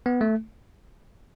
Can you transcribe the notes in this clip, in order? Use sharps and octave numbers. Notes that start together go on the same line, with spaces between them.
B3
A3